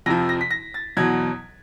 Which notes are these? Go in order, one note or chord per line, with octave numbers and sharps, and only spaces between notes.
F2 C3 F3 A#6
A#6
B6
A#6
A6
E2 B2 F#3 G#6